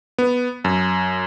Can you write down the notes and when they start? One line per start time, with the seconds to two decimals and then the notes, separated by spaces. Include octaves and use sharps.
0.18 B3
0.65 F#2